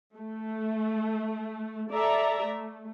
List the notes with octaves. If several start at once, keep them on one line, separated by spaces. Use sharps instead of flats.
A3
A4 D5 E5 A#5
A3